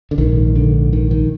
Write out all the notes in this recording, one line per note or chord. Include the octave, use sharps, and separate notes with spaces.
D3
A#1 G#2 D#3
D3
D#3
D#3